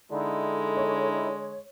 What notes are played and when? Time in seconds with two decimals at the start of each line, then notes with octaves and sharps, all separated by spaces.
0.11 D3 G#3 D#4 E4
0.77 C#5